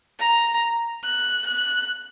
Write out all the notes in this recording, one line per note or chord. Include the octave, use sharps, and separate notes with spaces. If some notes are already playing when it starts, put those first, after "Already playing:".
A#5
F#6
F#6